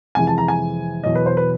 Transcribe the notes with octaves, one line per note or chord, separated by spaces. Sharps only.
F2 C3 E3 G#3 G#5
A5
A#5
G#5
E2 B2 F#3 D#5
B4
C5
B4